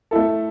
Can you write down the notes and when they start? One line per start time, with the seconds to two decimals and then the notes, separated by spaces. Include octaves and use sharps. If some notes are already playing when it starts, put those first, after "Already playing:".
0.11 A3 E4 A4